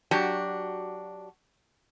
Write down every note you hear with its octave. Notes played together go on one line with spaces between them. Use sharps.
F#3 D4 F#4 G4